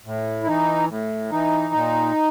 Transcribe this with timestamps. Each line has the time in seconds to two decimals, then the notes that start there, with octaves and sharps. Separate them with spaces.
0.06 A2
0.43 E4
0.48 E3 D#4
0.89 A2
1.32 E3 D#4
1.74 A#2